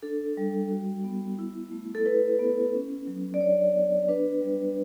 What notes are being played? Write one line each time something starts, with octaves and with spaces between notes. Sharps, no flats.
D4 A4
G3
F#4
B3
E4
A3
A4
E4 B4
B3
C#4
F#3
D5
D4 C#5
B3
D4 B4
G3